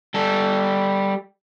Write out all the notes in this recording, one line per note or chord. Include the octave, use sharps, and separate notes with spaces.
G3 A4